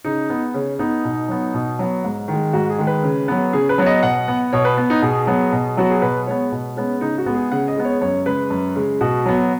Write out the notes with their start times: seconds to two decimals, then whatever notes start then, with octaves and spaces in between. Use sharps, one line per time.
0.04 C#3 D#4
0.30 B3
0.54 C#3 C#4
0.79 B3 D#4
1.05 B2
1.28 F#3 B3
1.54 B2
1.79 F#3 B3
2.04 G#2
2.28 D#3
2.33 G#3
2.53 G#2 F#4
2.70 G#4
2.78 D#3 G#3
2.87 B4
3.03 C#3
3.28 F#3 B3
3.53 C#3 G#4
3.69 B4
3.78 F#3 B3 C#5
3.86 D#5
4.03 B2 F#5
4.28 B3
4.53 B2 C#5
4.65 B4
4.78 B3
4.90 D#4
5.02 B2 G#4
5.27 F#3 B3
5.52 B2
5.77 F#3 B3 F#4
5.90 G#4
6.02 B2 B4
6.27 G#3 B3 C#5
6.52 B2
6.76 G#3 B3 C#4
7.01 C#3 D#4
7.18 F#4
7.26 G#3 B3
7.34 G#4
7.51 C#3 F#5
7.68 D#5
7.76 G#3 B3
7.85 C#5
8.01 F#2 C#5
8.26 C#3 G#3 B4
8.50 F#2
8.76 C#3 G#3
9.01 B2 F#4
9.25 F#3 B3